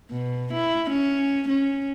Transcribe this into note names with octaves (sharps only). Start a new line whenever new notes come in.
B2
E4
C#4
C#4